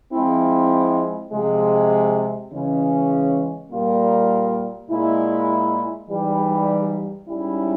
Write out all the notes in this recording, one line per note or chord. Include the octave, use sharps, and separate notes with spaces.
F3 G#3 C4 E4
C3 F3 G#3
C#3 E3 G#3 C#4
A#2 G3 A#3 F4 A#4
A#2 G#3 E4
G#2 E3 G3
G#2 G3 C#4 E4